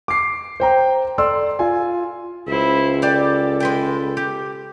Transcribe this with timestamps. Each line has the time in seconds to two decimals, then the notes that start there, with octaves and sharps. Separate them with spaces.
0.08 D6 C7
0.60 C5 G5 A#5
1.18 A4 D5 C6 E6
1.59 F4 G#5
2.47 C#2 E4 C5
3.02 G4 A4 D5
3.60 G#3 B4 G5
4.17 G4